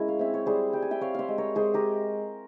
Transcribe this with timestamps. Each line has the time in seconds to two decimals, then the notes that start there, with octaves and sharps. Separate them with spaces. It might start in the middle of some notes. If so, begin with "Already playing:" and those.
Already playing: G#3 C#4 E4 A#4
0.08 F5
0.19 C4 E5
0.34 C#5
0.46 G3 G#4 C5
0.73 G3 G5
0.82 G#5
0.91 E5 G5
1.01 C4 C#5 F5
1.15 C5 E5 F5
1.28 G#3
1.38 A#4 C#5
1.55 G#3 G#4 C5
1.74 G4 A#4